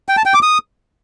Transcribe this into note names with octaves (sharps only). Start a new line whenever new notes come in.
G5
A5
G5
D6
D#6